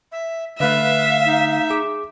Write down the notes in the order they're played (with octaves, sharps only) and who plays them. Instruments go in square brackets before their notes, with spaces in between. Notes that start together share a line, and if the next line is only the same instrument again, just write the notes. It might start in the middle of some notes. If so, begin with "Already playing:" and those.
[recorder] E5
[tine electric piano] D3 A3 [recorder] B4 [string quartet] E5 [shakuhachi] F5
[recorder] D#4
[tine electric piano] G#4 D6